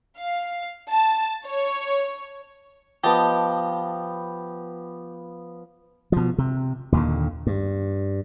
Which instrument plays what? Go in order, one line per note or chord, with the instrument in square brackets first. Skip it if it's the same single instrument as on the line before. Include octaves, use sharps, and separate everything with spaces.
[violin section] F5
A5
C#5
[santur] F3 B3 [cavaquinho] G4 D#5 A5
[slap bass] B2 F3
C3
D#2 A#2 D3
G2